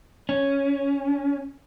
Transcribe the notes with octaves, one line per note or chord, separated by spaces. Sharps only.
C#4